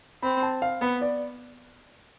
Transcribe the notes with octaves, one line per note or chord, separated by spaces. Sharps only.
C4 B5
A5
F5
B3 B4
D5